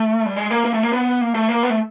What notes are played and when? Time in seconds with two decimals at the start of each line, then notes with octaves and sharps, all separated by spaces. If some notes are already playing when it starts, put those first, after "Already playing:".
Already playing: A3
0.26 G3
0.36 G#3
0.51 A#3
0.65 A#3
0.74 A3
0.83 A#3
0.93 B3
1.21 A#3
1.35 A3
1.49 A#3
1.63 B3
1.70 A3